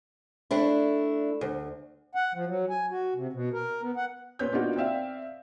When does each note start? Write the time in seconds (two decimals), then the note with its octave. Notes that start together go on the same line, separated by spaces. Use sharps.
0.51 A3 D4 E4
1.41 D2
2.15 F#5
2.34 F3
2.47 F#3
2.69 G#5
2.91 F#4
3.15 C3
3.33 B2
3.53 A#4
3.82 B3
3.97 F#5
4.39 A#2 B4 C#5 G6
4.53 A#3 B3 D4 D#4 F4 F#4
4.76 C4 D5 E5 F5